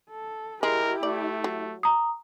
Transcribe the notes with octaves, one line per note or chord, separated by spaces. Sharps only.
A4
G#3 E4 G4 A#4
A3 D5
F#3
A#5 D#6